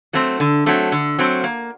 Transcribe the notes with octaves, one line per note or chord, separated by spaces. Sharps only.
F#3 A3 C4
D3
F#3 A3 C4
D3
F#3 A3 C4
A#3